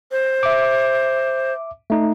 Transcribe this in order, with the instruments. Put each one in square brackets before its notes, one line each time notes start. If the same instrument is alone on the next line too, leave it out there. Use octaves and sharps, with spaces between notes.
[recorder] C5
[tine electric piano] E5 D6
A3 D#4